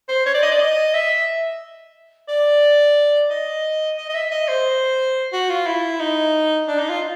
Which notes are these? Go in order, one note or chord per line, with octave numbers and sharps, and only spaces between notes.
C5
C#5
D5
D#5
D5
D#5
E5
D5
D#5
D#5
D#5
E5
D#5
C5
F#4
F4
E4
D#4
D4
D#4
F4